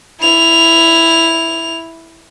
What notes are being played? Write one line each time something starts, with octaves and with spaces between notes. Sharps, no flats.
E4 F7